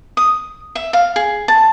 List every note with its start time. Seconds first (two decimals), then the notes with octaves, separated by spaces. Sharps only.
0.17 D#6
0.75 E5
0.93 F5
1.16 G#4
1.48 A5